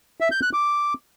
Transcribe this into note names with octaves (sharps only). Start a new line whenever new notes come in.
E5
G6
F#6
D6